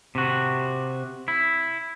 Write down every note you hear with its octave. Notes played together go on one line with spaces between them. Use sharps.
C3 F#4
E4